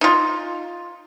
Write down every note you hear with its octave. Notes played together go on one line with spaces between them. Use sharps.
D#4 F4